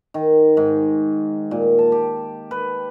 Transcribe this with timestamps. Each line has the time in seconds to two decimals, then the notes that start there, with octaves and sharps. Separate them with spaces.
0.14 D#3
0.57 G#2
1.51 A#2
1.79 A5
1.92 G4
2.51 B4